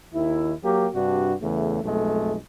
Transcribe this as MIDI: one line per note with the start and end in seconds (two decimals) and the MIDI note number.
0.14 0.53 39
0.14 0.53 51
0.14 0.53 64
0.64 0.88 54
0.64 0.88 58
0.64 0.88 67
0.94 1.34 43
0.94 1.34 48
0.94 1.34 62
0.94 1.34 66
1.42 1.83 40
1.42 1.83 49
1.42 1.83 57
1.84 2.37 35
1.84 2.37 41
1.84 2.37 56
1.84 2.37 57